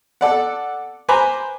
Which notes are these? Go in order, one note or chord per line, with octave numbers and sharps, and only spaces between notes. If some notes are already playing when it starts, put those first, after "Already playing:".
A4 D5 F#5
B4 C5 G#5 A#5 B5 D6